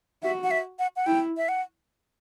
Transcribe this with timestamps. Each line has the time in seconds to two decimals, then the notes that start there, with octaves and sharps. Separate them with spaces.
0.23 F#4 E5
0.43 F#5
0.51 E5
0.79 F#5
0.96 F#5
1.06 E4 G5
1.37 E5
1.48 F#5